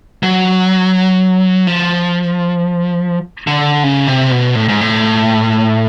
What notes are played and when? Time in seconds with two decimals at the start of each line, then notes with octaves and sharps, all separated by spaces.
0.23 F#3
1.67 F3
3.47 D3
3.83 C#3
4.07 C3
4.31 B2
4.55 A2
4.69 G#2
4.81 A2